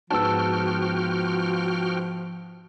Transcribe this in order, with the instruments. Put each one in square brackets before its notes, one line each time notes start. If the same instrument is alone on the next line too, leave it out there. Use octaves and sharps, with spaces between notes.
[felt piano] G#2 B3 [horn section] F3 [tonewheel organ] F#4 G5 F6 [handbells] A5 E6